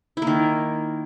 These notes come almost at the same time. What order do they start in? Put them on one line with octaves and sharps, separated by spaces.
E4 A#3 D#3